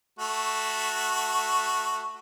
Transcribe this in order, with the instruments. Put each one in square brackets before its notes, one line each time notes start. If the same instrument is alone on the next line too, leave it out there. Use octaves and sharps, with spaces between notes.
[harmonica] A3 F#4